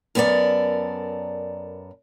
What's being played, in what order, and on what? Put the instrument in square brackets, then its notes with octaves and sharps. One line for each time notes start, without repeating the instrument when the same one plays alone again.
[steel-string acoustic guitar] F#2 B3 A4 A#4 D5